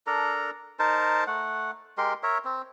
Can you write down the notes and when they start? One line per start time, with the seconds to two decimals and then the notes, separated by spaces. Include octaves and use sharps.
0.07 D4 A4 A#4 A#5
0.79 D#4 A#4 C5 A5
1.27 A3 F#5
1.98 G#3 G4 A#4 C6
2.23 A#4 C#5 E5
2.44 C4